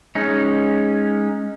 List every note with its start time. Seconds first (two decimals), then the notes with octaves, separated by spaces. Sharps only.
0.15 G#3 C#4 D#4